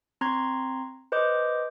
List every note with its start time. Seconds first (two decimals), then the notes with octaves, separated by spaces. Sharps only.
0.21 C4 A#5 C6 G#6
1.12 B4 C5 D#5 D6 G6